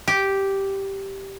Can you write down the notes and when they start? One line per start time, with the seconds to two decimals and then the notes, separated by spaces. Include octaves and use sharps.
0.08 G4